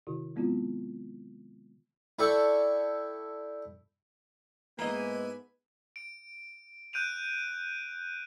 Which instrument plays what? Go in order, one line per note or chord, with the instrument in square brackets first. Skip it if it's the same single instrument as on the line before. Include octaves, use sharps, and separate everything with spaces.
[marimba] C3 D#3 E4 F#4
F#3 G#3 B3 C4 E4 F4
[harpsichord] E4 A4 D5 G5 C#6
[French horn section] G#2 G#3 [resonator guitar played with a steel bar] A#3 D#5 [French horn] B3 [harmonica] E4 B4 G#5
[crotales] D7
F#6 G6 D7 D#7 F7